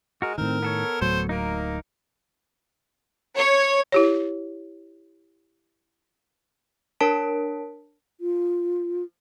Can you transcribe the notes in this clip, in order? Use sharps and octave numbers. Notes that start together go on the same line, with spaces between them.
G#3 F#4 A#4
A2 D#3 C4 A#4
B3 A4 C#5
D1 A2 F#3 C5
A#3 D#4 A#4
C#5
E4 G4 C#5
D4 A#4 C#5 A5 B6 D7
F4